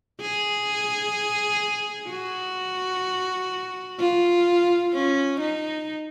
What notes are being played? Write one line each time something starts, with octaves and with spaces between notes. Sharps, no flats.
G#4
F#4
F4
C#4
D#4